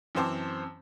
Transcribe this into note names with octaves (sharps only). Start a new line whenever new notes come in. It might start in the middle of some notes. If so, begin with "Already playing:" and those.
F#2 E3 C4 C5 A5 D6